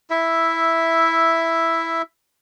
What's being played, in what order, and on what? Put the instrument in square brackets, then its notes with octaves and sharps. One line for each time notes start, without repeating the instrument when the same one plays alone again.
[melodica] E4 E5